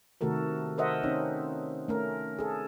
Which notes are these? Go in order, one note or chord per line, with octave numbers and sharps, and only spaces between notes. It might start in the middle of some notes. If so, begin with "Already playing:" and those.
C3 D#3 A3 F#4 A4 A#4
A4 A#4 C5 D#5 E5 F#5
C4 C#4 D#4
A3 C#4 A#4
G#4 A4